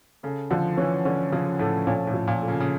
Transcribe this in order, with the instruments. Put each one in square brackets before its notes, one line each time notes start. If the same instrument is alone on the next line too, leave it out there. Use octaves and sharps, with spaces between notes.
[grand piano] C#3 [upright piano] A4
[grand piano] D3 [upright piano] F3
[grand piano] E3 [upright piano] C#4
[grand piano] D3 [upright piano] C#4
[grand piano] C#3 [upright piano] F3
[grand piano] A2 [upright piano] A4
[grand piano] A#2 [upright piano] C#4
[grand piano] A2
[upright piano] F3
[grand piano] A#2
[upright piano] A4
[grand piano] C#3
C#3